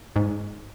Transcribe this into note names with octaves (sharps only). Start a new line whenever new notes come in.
G#2